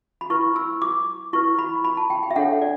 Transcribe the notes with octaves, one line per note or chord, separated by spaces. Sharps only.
B5
E4 B4 C#6
E6
D6
E4 B4 C#6
B5
B5
A5
G5
G5
E5
D4 A4 C#5 F#5
D5